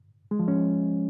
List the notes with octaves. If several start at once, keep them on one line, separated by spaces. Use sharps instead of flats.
G#3
F3
C#4